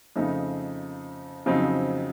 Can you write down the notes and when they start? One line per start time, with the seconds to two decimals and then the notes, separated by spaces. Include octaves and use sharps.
0.16 F2 C#3 A3 D#4
1.46 F2 C#3 F#3 C4 D#4